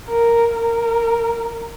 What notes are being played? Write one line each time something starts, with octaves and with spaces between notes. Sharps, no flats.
A#4
A#4